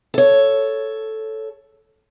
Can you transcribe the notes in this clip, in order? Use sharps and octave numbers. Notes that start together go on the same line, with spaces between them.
A4 C#5